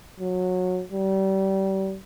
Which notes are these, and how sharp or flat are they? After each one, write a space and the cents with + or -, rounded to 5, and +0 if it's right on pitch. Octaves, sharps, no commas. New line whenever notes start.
F#3 -20
G3 -30